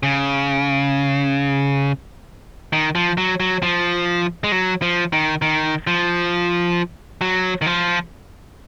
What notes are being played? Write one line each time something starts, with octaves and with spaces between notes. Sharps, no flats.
C#3
D#3
F3
F#3
F#3
F3
G#3
F#3
F3
D#3
D#3
F3
F#3
D#3
F3